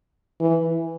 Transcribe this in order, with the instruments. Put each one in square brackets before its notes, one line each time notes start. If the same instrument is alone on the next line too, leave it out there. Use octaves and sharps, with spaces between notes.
[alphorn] E3